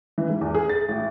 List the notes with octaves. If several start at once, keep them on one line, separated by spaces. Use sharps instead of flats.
E3
G#2
E2
G#4
A6
A1